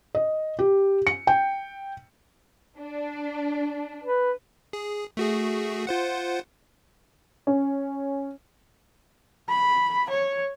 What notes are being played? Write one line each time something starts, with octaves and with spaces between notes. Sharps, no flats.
D#5
G4
C#7
G5
D4
B4
G#4
A3 F#4 G#4
F4 C5 F#5
C#4
B5
C#5